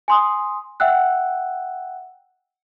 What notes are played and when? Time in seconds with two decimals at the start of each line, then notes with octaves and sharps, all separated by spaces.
0.08 G#5 C6 D#6
0.80 E5 F#5 G5 E6 F#6